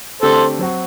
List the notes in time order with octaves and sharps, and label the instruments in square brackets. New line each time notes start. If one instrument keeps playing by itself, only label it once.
[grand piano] D3 A3 C4 G4 [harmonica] A4 C5
[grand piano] F#3 C4 F#4